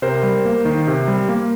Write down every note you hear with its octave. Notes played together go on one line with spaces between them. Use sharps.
C3 A#4 C5
G3
A#3
D#3
C3
G3
A#3